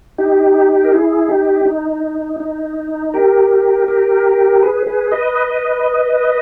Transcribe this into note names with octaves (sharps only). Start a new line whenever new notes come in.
D#4 G4
A#4
E4 G#4
D#4 G4
D#4
D#4
G4 A#4
G4 A#4
G#4 B4
G#4 B4
B4 D#5